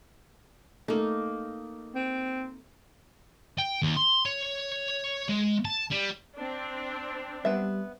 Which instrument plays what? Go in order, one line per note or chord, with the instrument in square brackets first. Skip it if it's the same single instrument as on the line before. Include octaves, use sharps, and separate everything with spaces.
[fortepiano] A3 [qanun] A#3 D#4
[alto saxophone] C4
[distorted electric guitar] G5
D#2
C6
C#5
G#3
A5
G3
[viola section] C4 D4
[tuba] G3 [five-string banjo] B3 E5